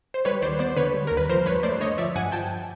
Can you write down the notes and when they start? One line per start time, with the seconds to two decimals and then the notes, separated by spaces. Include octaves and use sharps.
0.14 C5
0.25 G3 B4 C#5
0.42 D#2 C5 D5
0.59 B3 C5 D5
0.76 D3 B4 C#5
0.94 G3
1.07 D#2 A#4
1.17 B4
1.29 F3 A#4 C5
1.46 G2 B4 C#5
1.63 A3 C5 D5
1.80 D3 C#5 D#5
1.98 F3 D5 E5
2.15 G2 F#5 G#5
2.32 F3 G5 A5